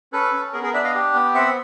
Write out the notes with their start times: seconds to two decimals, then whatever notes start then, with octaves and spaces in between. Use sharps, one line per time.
0.12 C#4 A4 B4
0.33 C#4
0.53 B3 G#4 A#4
0.63 G#4 A#4
0.73 D4 D5 E5
0.84 D#5 F5
0.95 G4
1.14 B3
1.34 C4 E5 F#5